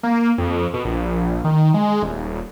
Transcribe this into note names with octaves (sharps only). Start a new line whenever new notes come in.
A#3
F2
B2
A#1
D#3
G#3
D#1